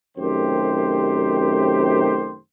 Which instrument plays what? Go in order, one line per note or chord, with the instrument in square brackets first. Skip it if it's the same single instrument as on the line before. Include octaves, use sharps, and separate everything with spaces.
[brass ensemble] F#2 C3 D#3 A3 G4 C5